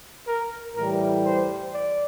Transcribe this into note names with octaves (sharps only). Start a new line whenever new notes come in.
A#4
A2 E3 G3 A#4
C5
D5